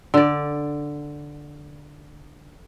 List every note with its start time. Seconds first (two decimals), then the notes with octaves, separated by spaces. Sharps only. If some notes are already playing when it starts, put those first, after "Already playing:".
0.14 D3 D5